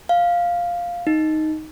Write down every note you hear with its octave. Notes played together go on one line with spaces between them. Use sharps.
F5
D#4